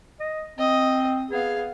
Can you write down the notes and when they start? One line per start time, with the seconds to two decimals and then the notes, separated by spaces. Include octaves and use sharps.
0.20 D#5
0.59 C4 D#5
1.31 B3 G#4 F5